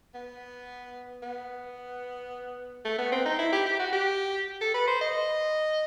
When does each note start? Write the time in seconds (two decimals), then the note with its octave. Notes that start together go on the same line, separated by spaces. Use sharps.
0.14 B3
1.23 B3
2.85 A3
2.99 B3
3.12 C4
3.26 D#4
3.39 E4
3.52 G4
3.66 G4
3.79 F#4
3.93 G4
4.61 A4
4.74 B4
4.87 C5
5.01 D#5